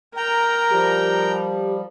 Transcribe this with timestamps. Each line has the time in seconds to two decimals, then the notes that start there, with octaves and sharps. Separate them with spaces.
0.17 A#4 G5 A#5
0.71 F3 G3 G4